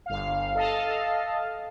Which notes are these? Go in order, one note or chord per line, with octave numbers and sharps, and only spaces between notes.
G1 F5
A4 D#5 F5 A5